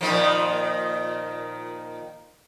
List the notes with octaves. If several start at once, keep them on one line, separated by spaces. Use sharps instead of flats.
A#2 D#3 F3